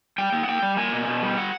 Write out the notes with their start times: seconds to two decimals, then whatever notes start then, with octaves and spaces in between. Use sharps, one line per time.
0.18 G3 G5
0.32 A#3
0.43 F#5
0.48 A#3 G5
0.62 G3
0.77 A#3 G#5
0.92 B2
1.08 B2
1.22 G3
1.38 F#5